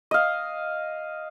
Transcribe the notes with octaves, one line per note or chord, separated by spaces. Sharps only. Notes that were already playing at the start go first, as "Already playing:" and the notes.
D#5 F5